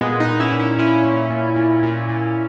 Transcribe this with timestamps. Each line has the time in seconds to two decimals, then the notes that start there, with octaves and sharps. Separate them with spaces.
0.01 A#2 G#3 B3
0.20 B3 D#4
0.27 A#2
0.40 C#4 E4
0.52 A#2
0.59 C#4 E4
0.78 A#2 C#4 E4
1.05 A#2
1.30 A#2
1.56 A#2
1.83 A#2
2.09 A#2